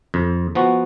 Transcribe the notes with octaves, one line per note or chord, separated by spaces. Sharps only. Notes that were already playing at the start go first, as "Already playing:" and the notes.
F2
F3 B3 F#4